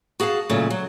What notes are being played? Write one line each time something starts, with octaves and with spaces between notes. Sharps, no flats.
F#4 G#4 F5 G#5 A5
A#2 C#3 F#3 A3
F#3